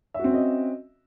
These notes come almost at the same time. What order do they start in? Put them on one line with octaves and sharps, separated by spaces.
E5 F#4 C4 C#4 D#5